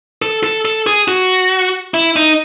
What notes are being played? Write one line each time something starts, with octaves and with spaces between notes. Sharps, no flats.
A4
A4
A4
G#4
F#4
E4
D#4